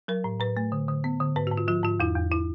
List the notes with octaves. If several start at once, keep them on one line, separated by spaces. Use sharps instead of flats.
F#3 A#4
A2
A2 B4
A3
D3
D3
B3
D3
G#2 B4
F#4
G#2
F4
F3 F4
G#2 F4
E2 E4
E2
E4